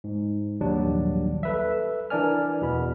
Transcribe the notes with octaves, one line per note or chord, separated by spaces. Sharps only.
G#2
A#1 D#2 F#3 G3 D4
A4 B4 E5
E3 D4 A#4 D5 G#5 F6
E2 B2 B5